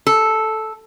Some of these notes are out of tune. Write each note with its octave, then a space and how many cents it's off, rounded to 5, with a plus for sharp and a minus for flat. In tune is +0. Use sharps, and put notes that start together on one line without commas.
A4 -5